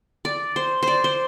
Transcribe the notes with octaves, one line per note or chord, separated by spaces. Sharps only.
D5
C5
C5 D5
C5